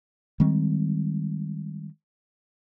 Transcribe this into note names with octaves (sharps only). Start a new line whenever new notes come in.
D#3 G3 G#3 C4